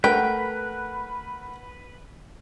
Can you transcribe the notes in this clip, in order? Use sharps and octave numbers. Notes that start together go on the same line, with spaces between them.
A3 A#4 B4 F#5 G5